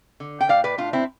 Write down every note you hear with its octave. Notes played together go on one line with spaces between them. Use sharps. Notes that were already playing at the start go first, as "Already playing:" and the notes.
D3
G5
A2 D5 F5
B4 D5
A2 D4 F4
C4 E4